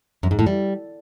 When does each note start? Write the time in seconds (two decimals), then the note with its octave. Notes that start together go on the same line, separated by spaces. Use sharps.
0.23 F#2
0.31 G#2
0.39 A2
0.47 G3